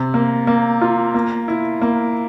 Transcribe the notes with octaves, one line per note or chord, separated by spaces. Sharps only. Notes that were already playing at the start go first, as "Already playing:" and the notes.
Already playing: C3
A#3
A#3
F4
A#3
E4
A#3